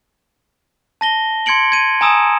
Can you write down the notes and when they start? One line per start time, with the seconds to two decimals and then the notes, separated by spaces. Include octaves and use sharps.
1.01 A5 A#6 G7
1.46 C6 G#6 C#7 D7 F#7
1.72 G#6 D#7
2.01 G#5 A#5 D#6 E6 E7